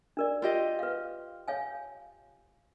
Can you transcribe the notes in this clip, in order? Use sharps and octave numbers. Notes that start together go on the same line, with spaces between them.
D4 A#4 D5
F4 G4 D#5
B4 F5
C#5 F5 G#5